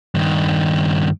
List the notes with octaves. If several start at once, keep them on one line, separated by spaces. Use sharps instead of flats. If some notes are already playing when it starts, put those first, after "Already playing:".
G2 D#3